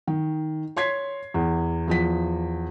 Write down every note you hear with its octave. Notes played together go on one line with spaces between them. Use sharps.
D#3
C#5 C6 G#6 B6 C7
E2
E2 F3 B6